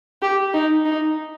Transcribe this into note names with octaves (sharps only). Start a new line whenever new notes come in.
G4
D#4
D#4